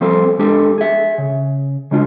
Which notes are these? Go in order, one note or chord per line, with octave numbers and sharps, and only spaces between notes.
F3 G3 C4 A4 C5
G#3 D4 G4 A4
G#4 E5
C#3
C#3 G#3 D4 F4